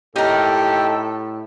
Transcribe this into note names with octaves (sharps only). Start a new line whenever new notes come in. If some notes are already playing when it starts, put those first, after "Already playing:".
A2 D#4 G4 A4 A#4